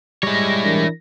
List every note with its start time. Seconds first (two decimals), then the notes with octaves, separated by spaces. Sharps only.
0.23 G3 G#3 E4 C#5 A#6
0.64 E3 D4 A#4